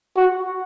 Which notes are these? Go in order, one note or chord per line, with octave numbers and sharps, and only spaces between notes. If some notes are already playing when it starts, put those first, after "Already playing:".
F#4